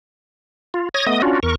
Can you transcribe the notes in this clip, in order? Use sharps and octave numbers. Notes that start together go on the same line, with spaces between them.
F4
C#5 D#6 G#6 A#6
A3 B3 D#5 D#6
C#4 D4 F4 F#4
E2 A#4 C#6